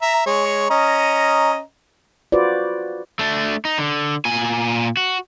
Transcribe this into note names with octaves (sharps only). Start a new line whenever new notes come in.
E5 A#5
G#3 C#5
C#4 D#5 A#5
F4 F#4 B4 C5 D5
A3 D4
D#4
D3
A#2 G#5
F#4